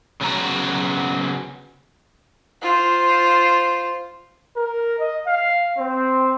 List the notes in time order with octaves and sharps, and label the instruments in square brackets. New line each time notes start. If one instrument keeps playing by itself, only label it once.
[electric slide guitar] C#3 F#3 B3 C#4 A#5
[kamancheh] F4 C5
[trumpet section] A#4
D#5
F5
C4